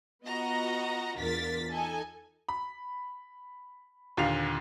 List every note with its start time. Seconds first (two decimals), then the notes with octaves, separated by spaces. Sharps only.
0.24 B3 F4 F#4 D#5 A#5
1.17 E2 D4 F4 A#4 A6 B6
1.71 D#4 A4 G#5
2.49 B5
4.17 D#2 A#2 D3 F5 F7